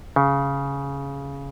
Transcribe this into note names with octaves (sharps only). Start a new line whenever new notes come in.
C#3